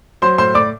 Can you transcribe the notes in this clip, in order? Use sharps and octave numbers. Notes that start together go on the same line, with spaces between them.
F#3 C5 C6
A2 C5 C6
A2 D5 D6